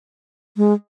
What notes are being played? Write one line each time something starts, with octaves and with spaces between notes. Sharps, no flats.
G#3